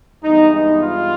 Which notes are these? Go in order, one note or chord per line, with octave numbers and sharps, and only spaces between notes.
G2 E3 G#3 B3 D#4
D#4
F4